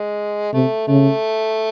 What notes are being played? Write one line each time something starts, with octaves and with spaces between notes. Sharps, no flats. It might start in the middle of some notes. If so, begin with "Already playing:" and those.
Already playing: G#3
C3 A3
C#3 A3